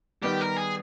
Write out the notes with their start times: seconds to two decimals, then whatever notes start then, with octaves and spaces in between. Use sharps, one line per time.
0.23 D#3 G3 B3 G4
0.40 A#4
0.56 G#4